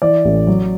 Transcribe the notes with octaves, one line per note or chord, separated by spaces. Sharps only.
E3 D5
A1
F#3